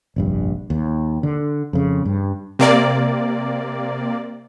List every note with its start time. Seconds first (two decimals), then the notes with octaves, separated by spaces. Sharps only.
0.16 F1 A#1 G2
0.70 D#2
1.23 D3
1.73 F2 C#3
2.05 G2
2.59 C3 A#3 D5